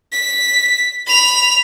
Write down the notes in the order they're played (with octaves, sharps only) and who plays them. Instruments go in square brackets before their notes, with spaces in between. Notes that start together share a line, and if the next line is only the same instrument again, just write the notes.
[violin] B6
B5 F7